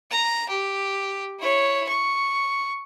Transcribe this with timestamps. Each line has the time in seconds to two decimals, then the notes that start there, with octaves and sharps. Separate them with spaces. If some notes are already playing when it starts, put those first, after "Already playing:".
0.11 A#5
0.49 G4
1.40 E4 C#5
1.88 C#6